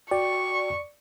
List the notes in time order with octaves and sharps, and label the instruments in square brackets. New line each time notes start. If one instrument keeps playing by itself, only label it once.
[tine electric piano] F#4 G5 [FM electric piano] D5 [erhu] C#6